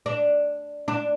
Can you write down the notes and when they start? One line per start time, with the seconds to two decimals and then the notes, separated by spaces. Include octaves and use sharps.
0.06 D4
0.88 D4